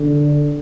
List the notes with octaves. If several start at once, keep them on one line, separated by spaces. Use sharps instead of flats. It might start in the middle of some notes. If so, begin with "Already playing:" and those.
Already playing: D3